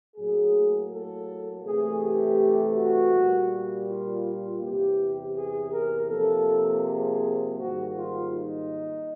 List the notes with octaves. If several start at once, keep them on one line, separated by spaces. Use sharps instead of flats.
A2 F#3 A#3 G#4
A4
C3 E3 A3 G#4
G4
F#4
A#2 G3 A#3
F4
F4
E2 C3 E3 G4
G#4
A#4
C3 F3 A#3 A4
G#4
G#2 D#3 G3 A#3 F#4
F4
D#4